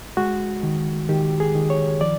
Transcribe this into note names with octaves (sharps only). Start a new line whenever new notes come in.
G#3 F#4
D#3
D#3 G4
G#4
D#3
C#5
F3 D5